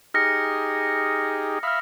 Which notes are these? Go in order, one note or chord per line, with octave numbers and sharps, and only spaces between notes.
D#4 G4 G#4 F6 A#6 C#7
E5 F5 B5 D#6 F6